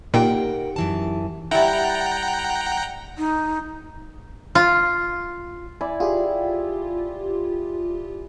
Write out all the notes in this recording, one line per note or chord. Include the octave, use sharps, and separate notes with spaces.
A#2 D#4 G4 A#4 F#5 G5
F#2 E3 A5
G3 E4 F#5 G5 A#5
D#4
F4
E4 D5 G#5
F4 G4 G#4